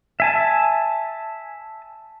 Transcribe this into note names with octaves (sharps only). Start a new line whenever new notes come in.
E5 G#5 A5